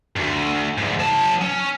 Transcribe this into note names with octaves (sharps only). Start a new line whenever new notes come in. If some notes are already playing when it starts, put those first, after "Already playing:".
D2 G2
D2 G#2
F#3 A5
C#4